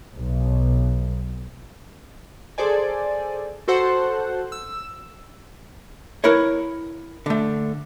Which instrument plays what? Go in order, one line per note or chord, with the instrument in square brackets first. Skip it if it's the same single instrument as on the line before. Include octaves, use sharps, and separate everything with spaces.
[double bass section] B1
[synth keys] G#4 A4 C5 D5 G#5
F#4 A4 C5 F#5
E6
[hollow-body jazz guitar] E4 A#4 B4 C#5
D3 A3